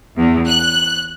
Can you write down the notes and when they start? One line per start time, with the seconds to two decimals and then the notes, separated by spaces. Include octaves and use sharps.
0.17 E2
0.48 F#6